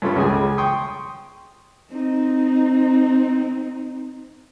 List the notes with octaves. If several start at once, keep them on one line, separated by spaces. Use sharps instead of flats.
G2 C#4 F4 A4 B5
C#2 G#4 G#5
G5 C6 C#6 D#6
C4 D#4